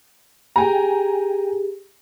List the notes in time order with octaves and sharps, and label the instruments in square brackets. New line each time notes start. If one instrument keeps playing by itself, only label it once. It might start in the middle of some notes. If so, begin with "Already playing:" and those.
[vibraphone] G4 G#4 [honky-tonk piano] G5 G#5 A#5